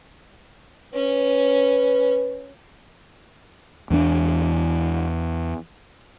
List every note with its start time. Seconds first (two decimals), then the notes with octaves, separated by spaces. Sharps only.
0.94 C#4 B4
3.90 E2 E3 A#3 D4